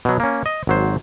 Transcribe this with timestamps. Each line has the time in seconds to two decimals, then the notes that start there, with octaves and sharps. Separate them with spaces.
0.05 B2 F#3
0.20 A#3 C#4
0.46 D#5
0.67 G#1 F#3 C5